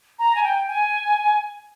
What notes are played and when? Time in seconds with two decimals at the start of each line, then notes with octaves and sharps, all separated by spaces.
0.19 A#5
0.35 G#5
0.43 G5
0.68 G#5